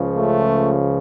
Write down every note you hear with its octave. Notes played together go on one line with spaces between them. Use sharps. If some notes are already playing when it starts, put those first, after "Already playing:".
Already playing: C#2 C#3 F3
A3